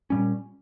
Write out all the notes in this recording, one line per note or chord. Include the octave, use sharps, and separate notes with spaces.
A#2 G3 C#4